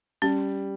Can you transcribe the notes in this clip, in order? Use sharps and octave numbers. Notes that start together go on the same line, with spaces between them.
G3 C#4